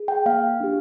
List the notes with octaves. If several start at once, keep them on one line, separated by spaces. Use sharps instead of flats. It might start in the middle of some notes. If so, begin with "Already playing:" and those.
Already playing: G#4
G5
A#3 F5
D4 G4